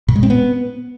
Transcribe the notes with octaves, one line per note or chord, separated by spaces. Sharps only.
A#2
G#3
C4
B3